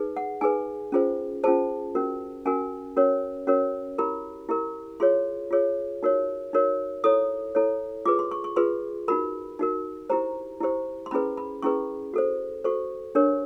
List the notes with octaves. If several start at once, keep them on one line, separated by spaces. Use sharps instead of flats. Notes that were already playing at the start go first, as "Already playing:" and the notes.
Already playing: D#4 G#4 B4
F#5
D#4 G#4 B4 G#5
C#4 F4 G#4 C5
C#4 F4 G#4 C5 A5
C#4 F#4 A#4
C#4 F#4 A#4 G#5
C#4 F#4 A#4 C#5
C#4 F#4 A#4 C#5
E4 G4 A#4 B5
E4 G4 A#4
F4 G#4 C#5 C6
F4 G#4 C#5
D#4 F#4 A#4 C#5
D#4 F#4 A#4 C#5
E4 A4 C#5 D#6
E4 A4 C#5
F4 G#4 B4 D6
C6
C#6
C#6
F4 G#4 B4 C6
D#4 F#4 A#4 B5
D#4 F#4 A#4
E4 G4 C5 A#5
E4 G4 C5
C6
C#4 E4 G#4 B4 B5
B5
C#4 E4 G#4 B4 C#6
F#4 A4 C5
F#4 A4 C5 C#6
D4 G4 A#4 C#5